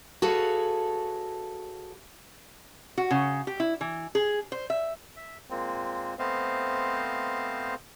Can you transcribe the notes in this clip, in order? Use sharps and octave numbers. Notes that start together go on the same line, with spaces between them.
F#4 G#4 A4 B4 C#5 F5
F#4
C#3
G4
E4
E3
G#4
C5
E5
E5
A#2 G#3 A#3 C4
A3 B3 C4 C5 D#5 F5